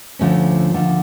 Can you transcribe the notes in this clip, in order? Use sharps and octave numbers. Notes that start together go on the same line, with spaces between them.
D2 D3 F3 A3 C#4
D#2 D3 F3